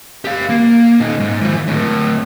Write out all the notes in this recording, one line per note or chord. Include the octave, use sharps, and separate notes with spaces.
G4 F5
A#3
A#2 D#4
G#2
E3 F3
D2 A2